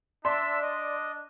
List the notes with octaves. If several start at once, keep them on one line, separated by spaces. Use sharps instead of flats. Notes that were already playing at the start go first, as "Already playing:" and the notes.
D4 D5 E5 A5 C6 E6
D#5